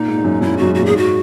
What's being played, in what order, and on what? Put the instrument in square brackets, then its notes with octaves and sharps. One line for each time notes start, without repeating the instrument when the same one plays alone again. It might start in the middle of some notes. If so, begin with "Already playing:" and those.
Already playing: [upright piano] A#2 [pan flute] D#4
[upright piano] G#2
G#2
F#2
[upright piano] F#2 [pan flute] E4
[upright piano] G#2
[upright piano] F#2 [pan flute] F#4
[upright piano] G#2
[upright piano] A#2 [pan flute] F#4
[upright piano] G#2 [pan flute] G#4
[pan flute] F#4